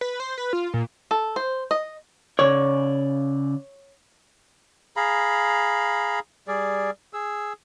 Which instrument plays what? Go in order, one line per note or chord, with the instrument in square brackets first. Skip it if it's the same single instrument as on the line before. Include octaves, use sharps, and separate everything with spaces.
[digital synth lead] B4
C5
B4
F4
A#2
[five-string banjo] A4
C5
D#5
[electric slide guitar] C#3 D5 [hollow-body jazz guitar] C#5
[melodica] G#4 F5 A#5 B5
G3 G#4 D5
G#4 E6